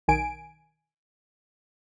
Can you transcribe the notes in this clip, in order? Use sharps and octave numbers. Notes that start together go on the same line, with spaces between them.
B1 D#3 G#5 D7